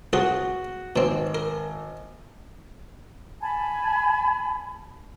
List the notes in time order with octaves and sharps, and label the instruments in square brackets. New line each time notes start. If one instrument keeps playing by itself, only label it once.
[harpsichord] C2 F4 G#4 [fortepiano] F#4
[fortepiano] G#1 [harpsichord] B2 C4
[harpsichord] A#4
[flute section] G#5 A5 B5